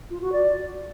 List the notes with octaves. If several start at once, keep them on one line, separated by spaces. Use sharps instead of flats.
F4
F#4
D5